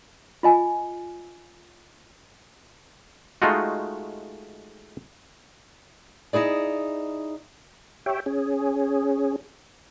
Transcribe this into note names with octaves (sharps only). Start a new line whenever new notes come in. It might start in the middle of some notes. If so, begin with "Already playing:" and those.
F4 D#5 G#5
G#3 A3 D#4 F4 F#4
D#4 E4 G#4 D5
G4 C#5 E5 G5
C#4 G#4